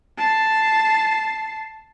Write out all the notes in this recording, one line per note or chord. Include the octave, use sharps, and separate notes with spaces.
A5 C7